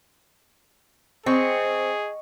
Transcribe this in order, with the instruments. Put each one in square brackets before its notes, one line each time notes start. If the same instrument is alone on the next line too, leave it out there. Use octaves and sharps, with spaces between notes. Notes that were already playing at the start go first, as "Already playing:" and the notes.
[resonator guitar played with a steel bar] C4 [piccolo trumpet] G#4 [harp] D#5 C#6